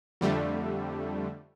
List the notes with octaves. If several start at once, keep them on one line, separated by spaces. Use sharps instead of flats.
F2 D3 G3 A3